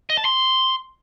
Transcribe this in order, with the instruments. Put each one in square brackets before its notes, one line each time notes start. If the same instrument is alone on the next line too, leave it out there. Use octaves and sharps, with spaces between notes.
[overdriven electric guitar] D#5
A5
C6